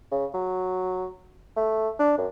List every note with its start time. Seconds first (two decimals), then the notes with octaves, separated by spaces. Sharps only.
0.12 C#3
0.34 F#3
1.57 A3
1.99 D4
2.18 F#2